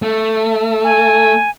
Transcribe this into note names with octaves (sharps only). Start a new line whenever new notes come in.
A3
G#5